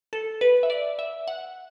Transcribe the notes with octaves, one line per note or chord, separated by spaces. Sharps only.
A4
B4
E5
D5
E5
F#5